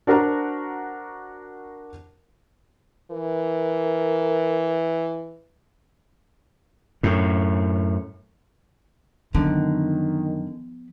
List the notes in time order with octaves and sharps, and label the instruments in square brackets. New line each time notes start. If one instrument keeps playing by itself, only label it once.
[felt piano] D4 F#4 A#4 C5 A#5
[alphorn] E3 [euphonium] A#4
[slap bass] F#2 A2
[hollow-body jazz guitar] F#2 D3 [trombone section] D#3 [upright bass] F3 B3